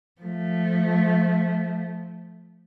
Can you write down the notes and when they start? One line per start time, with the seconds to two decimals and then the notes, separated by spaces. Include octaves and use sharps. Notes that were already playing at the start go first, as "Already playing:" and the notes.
0.22 F3 A3